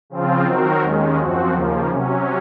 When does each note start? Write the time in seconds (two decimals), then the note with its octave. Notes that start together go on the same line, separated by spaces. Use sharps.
0.10 C#3 F3 C4 F4
0.46 D#3 F#3 C4 F#4 A#4
0.81 D#2 D#3 G#3 C#4
1.18 F#2 F3 C4 F#4
1.53 D#2 C#3 F3 A#3
1.88 C3 F#3 C#4